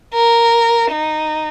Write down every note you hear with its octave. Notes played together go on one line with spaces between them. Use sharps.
A#4
D#4